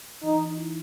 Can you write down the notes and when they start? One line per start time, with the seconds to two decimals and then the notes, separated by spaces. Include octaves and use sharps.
0.23 E3 D#4
0.35 E3
0.45 D#4
0.58 E4